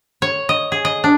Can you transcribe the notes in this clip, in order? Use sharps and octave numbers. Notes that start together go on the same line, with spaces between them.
C#5
D#5
G#4
D#5
D4